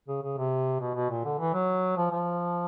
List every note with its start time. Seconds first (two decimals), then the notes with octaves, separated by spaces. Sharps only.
0.08 C#3
0.23 C#3
0.37 C3
0.80 B2
0.95 B2
1.10 A#2
1.25 D3
1.39 E3
1.53 F#3
1.97 F3
2.12 F3